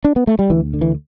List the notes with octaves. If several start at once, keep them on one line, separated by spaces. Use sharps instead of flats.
D4
B3
A3
G3
D2 E3
D3
E3